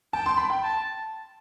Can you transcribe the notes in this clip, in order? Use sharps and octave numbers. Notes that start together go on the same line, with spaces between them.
G5 A5
C6
B5
G5
A5